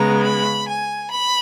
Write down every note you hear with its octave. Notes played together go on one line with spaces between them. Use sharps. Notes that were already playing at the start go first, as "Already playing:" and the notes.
Already playing: C#3 G#3 B3 A#5
B5
G#5
B5